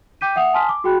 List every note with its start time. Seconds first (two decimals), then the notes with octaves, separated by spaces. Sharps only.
0.21 G5 D6 G6 B6 D#7
0.36 E5 F#5 D#6 F7
0.54 G#5 A5 C6 D#6 F6 B6
0.69 D6
0.84 F#4 G#4 G5 B5 F#6